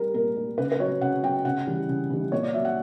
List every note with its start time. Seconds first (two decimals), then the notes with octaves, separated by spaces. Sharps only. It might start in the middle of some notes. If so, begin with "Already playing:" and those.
Already playing: G3 A#4
0.14 A#2 A#4
0.36 G3
0.58 C#3 B4
0.72 B4
0.80 F#3 C#5
1.01 C#3 F#5
1.23 F#3 G5
1.45 C#3 F#5
1.67 E3 G3
1.89 C#3
2.10 E3 G3
2.32 A#2 C#5
2.43 D5
2.54 F#3 E5
2.65 F#5